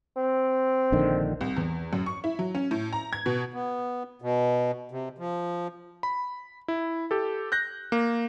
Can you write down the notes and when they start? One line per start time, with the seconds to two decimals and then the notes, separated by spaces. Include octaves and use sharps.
0.17 C4
0.92 A#1 D3 D#3
1.41 C2
1.56 E2
1.93 F#2
2.06 C#6
2.24 E4
2.39 F#3
2.55 C#4
2.71 A2
2.93 A#5
3.13 G#6
3.26 B2
3.54 B3
4.22 B2
4.91 C3
5.18 F3
6.03 B5
6.68 E4
7.11 G4 A4
7.52 F#6 G6 A#6
7.92 A#3